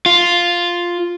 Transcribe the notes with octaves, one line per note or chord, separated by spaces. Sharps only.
F4